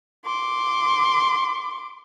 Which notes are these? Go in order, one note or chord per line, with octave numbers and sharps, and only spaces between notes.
C6 D6